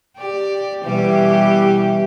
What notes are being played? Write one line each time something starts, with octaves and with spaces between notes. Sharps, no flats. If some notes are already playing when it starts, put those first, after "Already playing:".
G4 D5
B2 E3 G3 G4